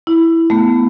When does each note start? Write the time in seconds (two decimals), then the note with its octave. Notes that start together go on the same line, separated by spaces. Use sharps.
0.07 E4
0.50 A3 B3